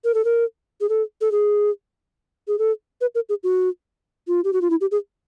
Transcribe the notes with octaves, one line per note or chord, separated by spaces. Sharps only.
A#4
A4
A#4
G#4
A4
A4
G#4
G#4
A4
B4
A#4
G#4
F#4
F4
G4
F#4
F4
E4
G4
G#4